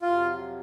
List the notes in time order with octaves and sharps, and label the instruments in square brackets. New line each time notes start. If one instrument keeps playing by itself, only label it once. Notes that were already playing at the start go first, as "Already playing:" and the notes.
[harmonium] F2 C3 F#3 [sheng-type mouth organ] F4